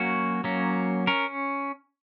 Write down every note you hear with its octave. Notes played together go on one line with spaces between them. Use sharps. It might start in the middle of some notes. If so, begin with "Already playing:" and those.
Already playing: F#3 A#3 C#4 F#4
F#3 A#3 C#4
C#4 A#4